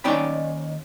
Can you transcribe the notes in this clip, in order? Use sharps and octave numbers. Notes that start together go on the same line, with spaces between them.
D#2 C#4 D#4 D5 G5 B5